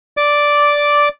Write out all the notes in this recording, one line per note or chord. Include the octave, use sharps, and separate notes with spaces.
D5 D6